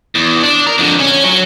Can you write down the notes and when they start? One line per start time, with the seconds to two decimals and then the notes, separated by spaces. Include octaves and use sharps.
0.15 E2
0.43 D4
0.67 A#4
0.78 F2 D3
1.00 C#4
1.25 F#3